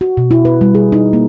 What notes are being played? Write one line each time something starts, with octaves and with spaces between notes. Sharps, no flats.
F#4
B2
E4
B4
G3
G#4
D#4
A#3